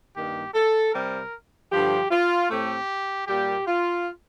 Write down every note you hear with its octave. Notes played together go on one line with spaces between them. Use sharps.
G2 D#3 A#3 G4
A4
C3 G3 C4 A#4
G2 D3 F3 G4
F4
A2 A3 C4 G4
A#2 G3 A#3 G4
F4